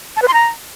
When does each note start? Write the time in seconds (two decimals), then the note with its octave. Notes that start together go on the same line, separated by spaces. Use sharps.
0.16 A5
0.22 B4
0.28 C6
0.34 A#5